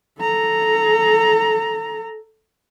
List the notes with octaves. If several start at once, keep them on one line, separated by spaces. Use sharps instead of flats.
A4 A#5